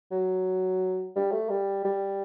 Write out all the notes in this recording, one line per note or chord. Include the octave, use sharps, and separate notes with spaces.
F#3
G3
A3
G3
G3